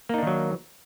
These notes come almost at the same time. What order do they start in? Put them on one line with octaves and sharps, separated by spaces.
A#3 D#4 D4 D#3 F#3